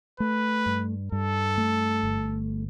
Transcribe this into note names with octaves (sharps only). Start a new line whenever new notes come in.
A3 B4
G2
G2 A4
A3
G1